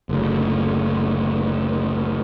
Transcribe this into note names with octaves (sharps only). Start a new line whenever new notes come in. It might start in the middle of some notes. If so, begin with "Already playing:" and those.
F#1 D2